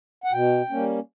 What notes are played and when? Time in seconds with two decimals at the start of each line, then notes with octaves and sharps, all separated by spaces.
0.24 F#5
0.32 B2 G5
0.70 G3 A#3 C#4